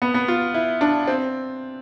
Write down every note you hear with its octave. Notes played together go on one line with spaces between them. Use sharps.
B3
B3
F4
E4
D4
C4